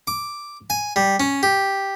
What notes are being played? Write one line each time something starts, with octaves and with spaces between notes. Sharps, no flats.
D6
G#5
G3
C#4
G4